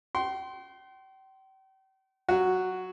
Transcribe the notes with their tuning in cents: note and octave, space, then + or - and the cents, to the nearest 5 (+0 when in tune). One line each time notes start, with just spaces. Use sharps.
G5 -40 C6 +0
F#3 +0 F#4 +0